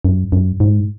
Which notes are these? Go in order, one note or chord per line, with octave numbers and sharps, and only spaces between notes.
F#2
F#2
G#2